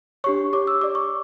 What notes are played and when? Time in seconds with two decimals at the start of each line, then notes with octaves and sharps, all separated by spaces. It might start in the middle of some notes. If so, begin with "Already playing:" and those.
0.24 D4 G4 C#5 C#6
0.53 G4 C#5 D6
0.67 E6
0.81 G4 D5 D6
0.95 C#6